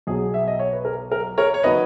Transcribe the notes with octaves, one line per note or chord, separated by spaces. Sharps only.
B1 B2 F#3 G#4
E5
D#5
C#5
B4
A#4
A#4
A#4 C#5
C#5
D#3 F#3 B4 D#5